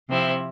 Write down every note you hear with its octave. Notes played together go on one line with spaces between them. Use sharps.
C3 F3 C4 E4